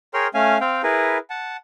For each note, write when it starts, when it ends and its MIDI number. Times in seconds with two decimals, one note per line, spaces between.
0.14 0.27 68
0.14 0.27 70
0.14 0.27 73
0.14 0.27 79
0.14 0.27 84
0.14 0.27 89
0.34 0.58 57
0.34 0.58 61
0.34 0.58 77
0.34 0.58 80
0.61 0.82 60
0.61 0.82 77
0.61 0.82 79
0.83 1.18 64
0.83 1.18 68
0.83 1.18 70
0.83 1.18 71
1.30 1.57 78
1.30 1.57 81